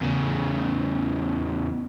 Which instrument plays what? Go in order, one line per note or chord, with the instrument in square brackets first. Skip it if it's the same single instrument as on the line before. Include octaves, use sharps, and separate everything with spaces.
[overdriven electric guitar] E2 C#3